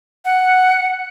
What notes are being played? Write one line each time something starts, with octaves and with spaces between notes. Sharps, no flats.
F#5